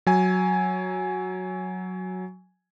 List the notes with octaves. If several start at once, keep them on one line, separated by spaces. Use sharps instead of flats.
F#3 G#5